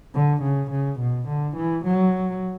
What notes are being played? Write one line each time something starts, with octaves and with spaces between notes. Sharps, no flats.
D3
C#3
C#3
B2
D3
E3
F#3